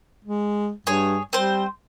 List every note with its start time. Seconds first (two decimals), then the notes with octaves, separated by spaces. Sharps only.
0.25 G#3
0.87 G2 G#4 C#5
1.33 G3 C4 C5